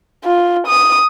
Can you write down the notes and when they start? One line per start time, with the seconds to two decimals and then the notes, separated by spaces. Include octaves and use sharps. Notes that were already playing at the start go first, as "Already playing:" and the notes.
0.24 F4
0.67 D#6